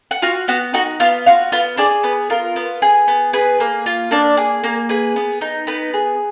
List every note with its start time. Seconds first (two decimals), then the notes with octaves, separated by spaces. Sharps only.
0.11 F#5
0.22 F4 F#4 F5
0.48 B3 F#4 F#5
0.74 D#4 F#4 F#5
1.00 B3 F4 F5
1.26 F4 F#4 F5
1.52 B3 F4 F5
1.77 D4 G#4 D5
2.03 B3 B4
2.30 F4 A#4
2.56 B3
2.82 G#4
3.08 B3
3.33 G#4 B4
3.60 A#3
3.86 F4
4.11 A#3 D4 D5
4.37 G#4
4.64 A#3
4.89 G#4 B4
5.16 B3
5.41 D#4
5.67 B3 B4
5.94 G#4